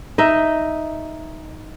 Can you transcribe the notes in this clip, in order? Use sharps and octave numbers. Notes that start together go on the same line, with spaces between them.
D#4 D#5 E5